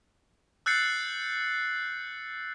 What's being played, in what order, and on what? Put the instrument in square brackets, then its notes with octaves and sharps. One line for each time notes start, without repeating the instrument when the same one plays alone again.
[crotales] E6 F#6 G6 A6 C7 C#7